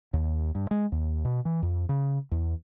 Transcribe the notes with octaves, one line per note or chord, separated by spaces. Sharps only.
D#2
G2
G#3
D#2
B2
E3
F2
C#3
E2